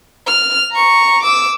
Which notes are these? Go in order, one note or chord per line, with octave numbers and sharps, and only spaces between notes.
F6
A#5 C#6
D6 E6